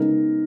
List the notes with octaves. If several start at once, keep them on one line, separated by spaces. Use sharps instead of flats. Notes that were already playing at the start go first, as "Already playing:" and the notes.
Already playing: C#3 G#3 B3 D#4 A#4